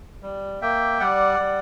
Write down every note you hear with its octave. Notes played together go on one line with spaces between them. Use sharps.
G3
A#3 E5 G5
G3 D5 F#5
G3